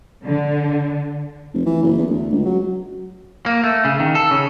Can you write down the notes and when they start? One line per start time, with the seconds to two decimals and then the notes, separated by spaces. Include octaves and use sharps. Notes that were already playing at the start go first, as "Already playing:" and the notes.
0.25 D3
1.54 F1
1.66 E3
1.82 F#1
1.97 E2
2.10 D2
2.32 C#2
2.45 F#3
3.46 A#3
3.64 A3
3.85 C#3
4.00 D#3
4.15 A4
4.31 C#3